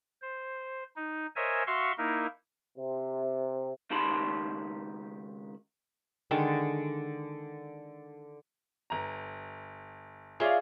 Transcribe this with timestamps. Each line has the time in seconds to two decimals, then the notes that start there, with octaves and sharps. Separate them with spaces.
0.22 C5
0.96 D#4
1.36 A#4 C5 C#5 D#5 E5 G#5
1.67 F#4 E5 F5 C6 C#6
1.98 A#3 D#4 E4 A#4
2.77 C3
3.90 C#2 D#3 G4 A5 B5 C6
6.31 D3 D#3 G#3 D4
8.90 G1 A#5
10.40 F4 G#4 C#5 D5 E5